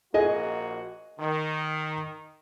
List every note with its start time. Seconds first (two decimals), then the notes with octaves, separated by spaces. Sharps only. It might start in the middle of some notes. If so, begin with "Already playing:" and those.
0.14 A#1 A#3 F#4 G#4 D#5 G#5
1.19 D#3